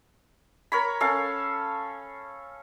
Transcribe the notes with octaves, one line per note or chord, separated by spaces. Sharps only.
A#4 C#5 B5
C#4 A4 F5